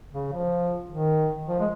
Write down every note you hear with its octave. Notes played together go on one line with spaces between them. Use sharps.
C#3
F3
D#3
F3
G#3